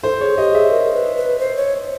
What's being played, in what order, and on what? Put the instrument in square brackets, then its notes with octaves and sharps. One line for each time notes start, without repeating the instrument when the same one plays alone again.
[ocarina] A4 [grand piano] C5
[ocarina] G#4 [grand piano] C#5
[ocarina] G4 [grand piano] D#5
[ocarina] G#4 [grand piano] E5
[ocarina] A#4
B4
B4
C5
C#5